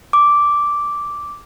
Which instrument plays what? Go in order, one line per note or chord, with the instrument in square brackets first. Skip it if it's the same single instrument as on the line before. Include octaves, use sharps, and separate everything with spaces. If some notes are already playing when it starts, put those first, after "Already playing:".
[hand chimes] D6